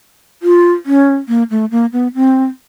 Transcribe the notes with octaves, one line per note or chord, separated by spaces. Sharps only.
F4
C#4
A#3
A3
A#3
B3
C4